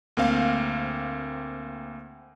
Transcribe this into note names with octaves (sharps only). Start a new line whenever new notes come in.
D2 A#3 C4 F5